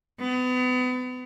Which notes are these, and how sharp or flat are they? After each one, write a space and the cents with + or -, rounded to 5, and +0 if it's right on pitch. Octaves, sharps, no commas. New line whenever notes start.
B3 +35